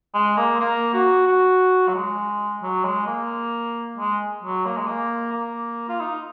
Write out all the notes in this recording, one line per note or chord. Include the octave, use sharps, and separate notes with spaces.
G#3
A#3
A#3
F#4
F#4
F#3
G#3
F#3
G#3
A#3
G#3
F#3
A#3
G#3
A#3
A#3
F4
D#4